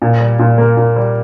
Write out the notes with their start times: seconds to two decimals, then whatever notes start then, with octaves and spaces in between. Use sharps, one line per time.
0.02 A#2
0.20 G3
0.39 A#2
0.58 A#3
0.77 A#2
0.96 G3